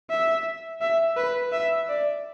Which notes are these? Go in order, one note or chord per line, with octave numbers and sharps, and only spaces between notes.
E5
E5
B4
E5
D5